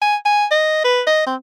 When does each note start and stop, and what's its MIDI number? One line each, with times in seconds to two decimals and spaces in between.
0.01 0.16 80
0.25 0.45 80
0.51 0.82 75
0.84 1.01 71
1.07 1.26 75
1.26 1.35 60